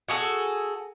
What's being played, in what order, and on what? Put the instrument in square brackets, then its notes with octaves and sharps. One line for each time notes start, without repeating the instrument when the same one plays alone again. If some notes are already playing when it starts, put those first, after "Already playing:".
[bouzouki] F#4 G#4 A4